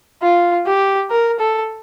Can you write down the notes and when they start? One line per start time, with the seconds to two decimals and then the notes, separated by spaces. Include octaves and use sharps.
0.22 F4
0.66 G4
1.10 A#4
1.39 A4